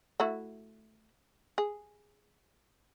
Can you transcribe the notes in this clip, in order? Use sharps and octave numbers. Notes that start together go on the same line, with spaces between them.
A3 E4 F#4
G#4